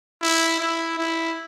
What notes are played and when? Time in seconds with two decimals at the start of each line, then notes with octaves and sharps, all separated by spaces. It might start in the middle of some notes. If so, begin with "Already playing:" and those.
0.22 E4
0.60 E4
0.98 E4